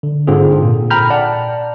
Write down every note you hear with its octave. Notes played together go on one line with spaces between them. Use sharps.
D3
G#2 D3 C4 F4 G#4
A#2
G5 A#5 B5 F6 G6
D5 F#5 A5